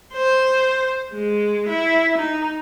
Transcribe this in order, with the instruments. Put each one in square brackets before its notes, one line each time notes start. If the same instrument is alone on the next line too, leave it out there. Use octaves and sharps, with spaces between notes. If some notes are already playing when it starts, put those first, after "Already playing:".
[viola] C5
G#3
E4
D#4